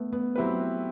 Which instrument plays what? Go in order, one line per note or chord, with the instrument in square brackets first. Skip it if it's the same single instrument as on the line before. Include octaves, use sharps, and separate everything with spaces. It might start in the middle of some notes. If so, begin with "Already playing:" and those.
Already playing: [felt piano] A3 B3
B3
[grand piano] F#3 C4 E4 G4 B4